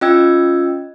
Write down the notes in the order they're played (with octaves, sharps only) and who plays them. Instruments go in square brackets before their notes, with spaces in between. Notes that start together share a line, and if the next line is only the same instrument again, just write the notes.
[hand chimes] C#4 F4 D#5 G5 E6 G#6